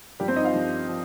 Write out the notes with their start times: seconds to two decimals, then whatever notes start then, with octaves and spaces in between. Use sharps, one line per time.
0.20 G2 F3 G3 G4
0.28 C4 C5
0.36 D#4 D#5
0.44 F4 F5
0.53 G2 F3
0.88 F3